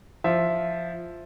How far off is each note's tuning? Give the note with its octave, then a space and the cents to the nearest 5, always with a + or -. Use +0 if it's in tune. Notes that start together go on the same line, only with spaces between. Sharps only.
F3 +0 E5 +0